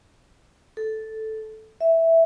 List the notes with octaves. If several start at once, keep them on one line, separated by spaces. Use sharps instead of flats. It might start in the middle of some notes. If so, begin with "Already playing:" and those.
A4
E5